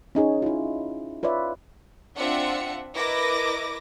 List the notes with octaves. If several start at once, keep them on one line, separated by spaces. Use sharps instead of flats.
C#4 D#4 G#4 C#5
E4 F4
F4 B4 C#5 D5 E5
C4 D4 F4 E5 F#5 C#7
E4 A#4 B4 D#5 D6 A#6